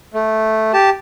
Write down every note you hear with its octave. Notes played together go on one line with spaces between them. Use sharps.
A3
G4 A5